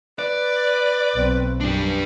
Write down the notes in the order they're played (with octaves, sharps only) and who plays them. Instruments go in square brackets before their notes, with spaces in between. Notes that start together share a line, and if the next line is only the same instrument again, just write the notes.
[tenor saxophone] B4 [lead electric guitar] D5
[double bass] B1 C4
[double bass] F#2 [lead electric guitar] D4 G4